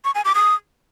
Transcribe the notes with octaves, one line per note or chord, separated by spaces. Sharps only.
C#6
G#5
D6
D#6